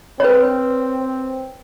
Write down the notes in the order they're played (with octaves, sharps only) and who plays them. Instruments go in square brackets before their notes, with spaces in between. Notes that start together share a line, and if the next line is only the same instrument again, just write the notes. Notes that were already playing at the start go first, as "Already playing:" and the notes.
[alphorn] C4 [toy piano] B4 C#5